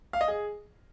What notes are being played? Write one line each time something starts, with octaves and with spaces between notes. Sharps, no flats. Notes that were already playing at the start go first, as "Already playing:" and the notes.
F5
D#5
G#4